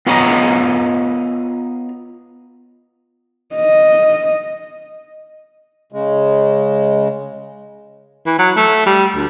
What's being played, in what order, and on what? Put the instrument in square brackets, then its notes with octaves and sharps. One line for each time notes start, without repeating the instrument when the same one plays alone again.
[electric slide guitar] B3 F4 B4 C#5 D#5 A#5
[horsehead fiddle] D#5
[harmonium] C#3 G#3
[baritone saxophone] E3
F#3
A3
G3
D2